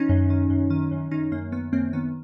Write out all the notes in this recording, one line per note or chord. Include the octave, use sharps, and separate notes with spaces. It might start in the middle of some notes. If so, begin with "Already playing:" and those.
Already playing: D#3 C#4 D#4
F#2
D#3
F#2
D#3
F#2
D#3 C#4 D#4
F#2 A#3
D#3 B3
F#2 A#3 C4
D#3 B3